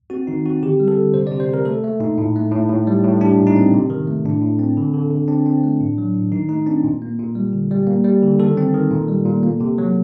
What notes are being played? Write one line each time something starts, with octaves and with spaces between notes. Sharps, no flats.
C4 F#4
D#3 D#4
C4 F#4
D3 G4
G3
A4
D3
C3 C5
D5
C3
C5
C3 A#4
A3 A4
A3
A#2 D#4
A2
A3
A2
A2
G3
A2
G3 D4
A#2
D#4
C4
C3
D#3
A3
A2 D4
A2
C4
D3
D3
D3
C4 D4
C4
A3
A2
F#3
A2
D#3 D#4
A3 D#4
C4 D4
A#2
A#3
A#2
G3
D3
G3
A#3
G3
D3
D#3 A4
C4
D#3
A#2
G3
A#2
A#3
C3
F#3